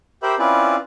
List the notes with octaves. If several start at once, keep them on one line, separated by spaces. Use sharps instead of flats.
G4 A#4 C5 E5 B5
C4 C#4 E4 F4 B4 D5